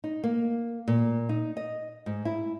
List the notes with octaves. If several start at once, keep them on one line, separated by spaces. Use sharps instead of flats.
D#4
A#3
A#2
D#4
D#5
G#2
E4